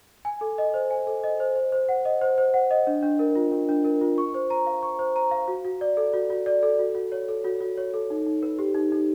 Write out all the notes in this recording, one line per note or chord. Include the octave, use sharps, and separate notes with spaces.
G#5
A4
D#5
C5
G#5
A4
D#5
C5
C5
C5
F#5
D#5
C5
C5
F#5
D#5
D4
D4
A#4
F4
D4
D4
A#4
F4
C#6
C5
A#5
F5
C#6
C5
A#5
F5
F#4
F#4
D5
A4
F#4
F#4
D5
A4
F#4
F#4
C#5
A4
F#4
F#4
C#5
A4
D#4
D#4
B4
G4
D#4
D#4